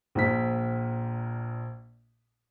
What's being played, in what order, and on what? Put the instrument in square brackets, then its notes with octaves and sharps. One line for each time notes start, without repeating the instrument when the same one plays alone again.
[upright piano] A#1 A#2 B6